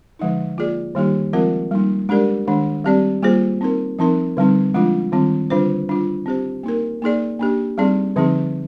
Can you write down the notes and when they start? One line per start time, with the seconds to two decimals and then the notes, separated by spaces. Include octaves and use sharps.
0.19 D3 F3 G#3 D#4
0.57 A#3 F4 G#4 D5
0.95 D#3 G3 A#3 D#4 G4
1.33 F3 G#3 C4 F4 A#4
1.71 G3 A#3 D#4
2.09 G#3 D4 G4 A#4 D5
2.48 D#3 G#3 D4
2.84 G3 C4 G4 D5
3.23 G3 A#3 F4 G#4 C5
3.61 C4 D#4 A#4
3.99 F3 C4 D#4 A#4
4.37 D3 G3 C4 D#4
4.74 F3 G#3 D4 F4
5.12 D#3 G3 C4 F4
5.50 D3 G3 D4 F4 C5
5.89 G3 D4 F4
6.26 C4 G4 C5
6.63 A#3 D#4 A#4
7.02 A#3 D#4 G#4 D5
7.39 A#3 D4 G4
7.78 G3 C4 D#4 G#4 D5
8.16 D3 F3 C4 D#4 G#4